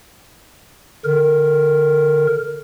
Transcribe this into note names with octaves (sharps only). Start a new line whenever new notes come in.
D3 A#4